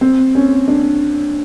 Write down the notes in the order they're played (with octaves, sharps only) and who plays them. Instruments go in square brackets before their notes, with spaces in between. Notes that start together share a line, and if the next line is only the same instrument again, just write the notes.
[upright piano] C4
C#4
D4